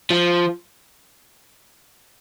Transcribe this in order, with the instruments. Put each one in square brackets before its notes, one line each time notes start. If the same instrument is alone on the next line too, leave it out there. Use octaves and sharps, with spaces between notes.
[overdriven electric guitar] F3